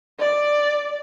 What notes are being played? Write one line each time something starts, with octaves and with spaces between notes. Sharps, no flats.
D5